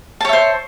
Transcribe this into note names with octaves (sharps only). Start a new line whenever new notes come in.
C5 C#5 E5 A5